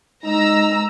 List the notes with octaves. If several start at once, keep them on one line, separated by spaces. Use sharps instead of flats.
G#3 D#4 A#5 E6